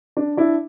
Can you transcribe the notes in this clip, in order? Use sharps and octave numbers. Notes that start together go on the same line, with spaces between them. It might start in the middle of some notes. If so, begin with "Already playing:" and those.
D4
D4 E4